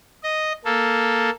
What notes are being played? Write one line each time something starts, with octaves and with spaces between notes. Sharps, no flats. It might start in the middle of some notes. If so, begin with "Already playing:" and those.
D#5
A#3 A4